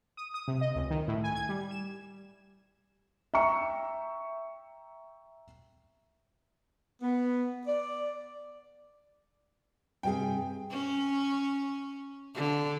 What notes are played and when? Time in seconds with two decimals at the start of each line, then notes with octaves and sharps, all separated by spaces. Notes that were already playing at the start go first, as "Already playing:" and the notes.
0.17 D#6
0.34 D#6
0.48 C3
0.61 D#5
0.76 C#2
0.90 D#3
1.08 A2
1.24 G#5
1.35 G#6
1.49 G3
1.71 E7
3.34 E5 G5 A#5 C#6 C#7
7.02 B3
7.66 D5
10.03 G2 C3 G#4 G5
10.70 C#4
12.34 D3